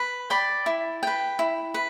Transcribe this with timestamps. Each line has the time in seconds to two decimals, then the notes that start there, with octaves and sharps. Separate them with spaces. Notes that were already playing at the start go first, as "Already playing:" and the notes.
Already playing: B4
0.30 D5 G5 B5
0.66 E4
1.03 B4 G5
1.39 E4
1.74 B4